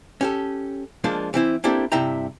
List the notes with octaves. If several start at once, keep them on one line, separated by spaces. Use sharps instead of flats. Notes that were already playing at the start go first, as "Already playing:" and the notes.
C#4 G4 A4
F3 G#3 A#3 D4 F4
E3 C4 E4
A#3 C4 D4 E4 G4 A4
G2 C3 E4 E5 G5 A#5